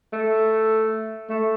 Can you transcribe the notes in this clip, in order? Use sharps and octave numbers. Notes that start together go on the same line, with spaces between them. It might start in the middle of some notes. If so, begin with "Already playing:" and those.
A3
A3